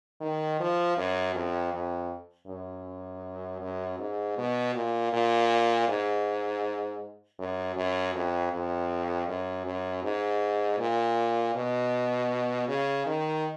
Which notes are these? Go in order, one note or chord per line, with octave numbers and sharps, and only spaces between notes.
D#3
F3
F#2
F2
F2
F#2
F#2
G#2
B2
A#2
A#2
G#2
F#2
F#2
F2
F2
F#2
F#2
G#2
A#2
B2
C#3
D#3